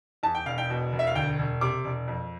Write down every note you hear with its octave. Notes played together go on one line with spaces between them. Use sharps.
E2 A5
G5
E1 F5
G5
B2
E1
E5
F5
D2 G5
E1
C3 D6
E1
F2